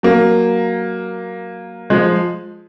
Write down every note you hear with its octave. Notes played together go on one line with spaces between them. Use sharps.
F#3 A#3
F3 G#3